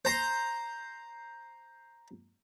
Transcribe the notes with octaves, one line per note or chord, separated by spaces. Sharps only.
C5 A#5 C6